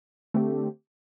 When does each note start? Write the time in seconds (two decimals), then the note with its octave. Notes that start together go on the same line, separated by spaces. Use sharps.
0.34 D3 A3 C4 G4